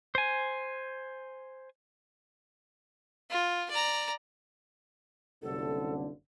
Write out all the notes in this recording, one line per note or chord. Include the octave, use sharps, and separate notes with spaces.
C5 G#5
F4
D5 A#5
F#1 C2 D3 A4